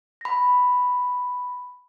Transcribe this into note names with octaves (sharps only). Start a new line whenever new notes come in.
B5 A#6